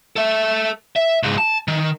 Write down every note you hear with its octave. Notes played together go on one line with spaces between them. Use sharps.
A4 E5
E5
C#2 G#2
A5
D#3